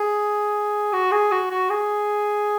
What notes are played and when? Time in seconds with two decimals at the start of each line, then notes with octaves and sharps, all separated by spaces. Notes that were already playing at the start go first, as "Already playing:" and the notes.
Already playing: G#4
0.93 F#4
1.12 G#4
1.32 F#4
1.51 F#4
1.70 G#4